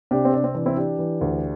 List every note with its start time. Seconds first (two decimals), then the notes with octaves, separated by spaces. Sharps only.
0.11 C3 D4 G4
0.25 C4
0.33 C3 D4
0.44 C4
0.55 E3 D4
0.66 C4 E4
0.77 E3 D4 G4
0.99 E3
1.21 D2